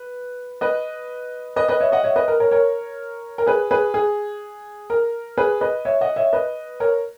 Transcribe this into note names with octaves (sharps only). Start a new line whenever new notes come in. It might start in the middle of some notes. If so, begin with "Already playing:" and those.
Already playing: B4
B4 D#5
B4 D#5
B4 D#5
C#5 E5
D#5 F#5
C#5 E5
B4 D#5
A#4
A#4 C#5
A#4 C#5
A#4
G#4 B4
G#4 B4
G#4
A#4
G#4 B4
B4 D#5
C#5 E5
D#5 F#5
C#5 E5
B4 D#5
A#4 C#5